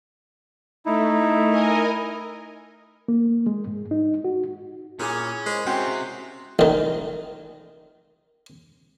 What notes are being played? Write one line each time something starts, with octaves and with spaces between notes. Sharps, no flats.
A3 D#4 E4
A#4 D#5 G#5
A#3
G#3
G#2
D#4
F#4
A#2 C#4 E4 G#4 D6
G#3 A#4 C5 D#5
C3 C#4 F#4 C5 G5 C6 F#6 C7
A1 D#3